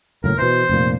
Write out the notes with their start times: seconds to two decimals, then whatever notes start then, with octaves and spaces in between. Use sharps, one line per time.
0.24 F#1 A2 A#4
0.38 B2 E3 C5
0.69 F1 A#2